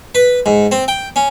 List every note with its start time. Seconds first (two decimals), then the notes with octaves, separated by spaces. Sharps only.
0.15 B4
0.46 G#2
0.72 C4
0.88 G5
1.16 C#4